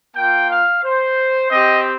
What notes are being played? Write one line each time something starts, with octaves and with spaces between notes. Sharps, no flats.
A#3 F4 G5
F5
C5
C4 G4 D#5